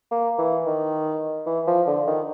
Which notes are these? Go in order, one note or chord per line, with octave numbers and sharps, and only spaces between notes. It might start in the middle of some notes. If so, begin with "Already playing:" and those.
A#3
E3
D#3
E3
F3
D3
D#3